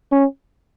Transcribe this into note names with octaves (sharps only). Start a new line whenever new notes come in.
C#4